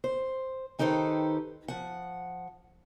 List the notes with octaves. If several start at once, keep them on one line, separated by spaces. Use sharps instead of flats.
C5
D#3 D#4 G4 A4 B4 C5
F3 F#5